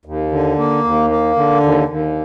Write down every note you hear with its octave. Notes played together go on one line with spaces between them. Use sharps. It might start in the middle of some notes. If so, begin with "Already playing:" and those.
D#2
D3
A#3
D#2
A#3
D3
D#2
D#2